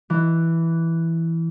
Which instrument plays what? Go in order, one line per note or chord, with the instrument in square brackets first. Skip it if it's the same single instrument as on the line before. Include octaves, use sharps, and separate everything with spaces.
[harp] E3